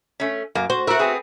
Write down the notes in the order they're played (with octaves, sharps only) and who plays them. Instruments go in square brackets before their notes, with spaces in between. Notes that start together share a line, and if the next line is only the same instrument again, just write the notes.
[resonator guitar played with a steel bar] A3 C#4
[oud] F#2 [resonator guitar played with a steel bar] A#3
[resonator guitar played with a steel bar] F#4 [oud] C5
[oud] F#4 E5 [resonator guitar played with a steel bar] A#4
[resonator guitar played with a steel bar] B3 C4 G#4